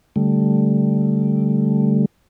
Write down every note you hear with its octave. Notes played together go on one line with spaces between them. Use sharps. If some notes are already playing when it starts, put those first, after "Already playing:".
D3 G3 A3